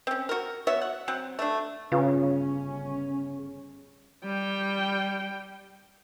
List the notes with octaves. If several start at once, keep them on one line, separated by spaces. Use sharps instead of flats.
C4 C#4
F#4 A#4
B3 F#4 C#5 E5
F#5
F#3 C4 F#5
A3 D4
G1 C#3 C#4 F4 B4 F5
G3 G5